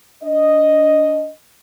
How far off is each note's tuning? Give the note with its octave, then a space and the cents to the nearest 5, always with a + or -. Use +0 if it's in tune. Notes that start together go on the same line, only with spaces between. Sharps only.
D4 -30 D#5 +0